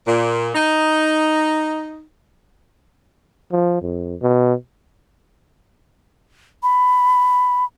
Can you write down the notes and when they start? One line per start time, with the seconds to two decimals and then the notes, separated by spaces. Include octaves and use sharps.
0.07 A#2
0.55 D#4
3.52 F3
3.81 F2
4.22 B2
6.63 B5